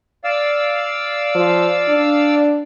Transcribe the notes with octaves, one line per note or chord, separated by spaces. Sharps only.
D5 F5 E6
F3
D4